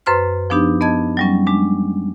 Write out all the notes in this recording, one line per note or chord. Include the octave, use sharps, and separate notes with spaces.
F#2 B4 C5 C6 F6
F3 B3 D4 D#4 G4
B3 D#5 A5 G#6
F#3 G3 C#4
G#3 D4